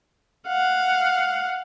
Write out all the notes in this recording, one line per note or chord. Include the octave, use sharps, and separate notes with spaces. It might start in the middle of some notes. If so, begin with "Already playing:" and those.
F5 F#5